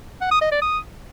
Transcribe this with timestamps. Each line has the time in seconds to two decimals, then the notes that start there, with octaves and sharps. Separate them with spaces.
0.21 F#5
0.31 D#6
0.41 D#5
0.52 D5
0.62 D#6